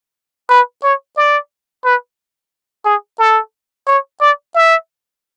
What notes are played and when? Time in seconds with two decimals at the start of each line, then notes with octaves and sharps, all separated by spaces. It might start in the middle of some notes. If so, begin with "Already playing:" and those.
0.50 B4
0.83 C#5
1.17 D5
1.85 B4
2.85 G#4
3.19 A4
3.87 C#5
4.21 D5
4.55 E5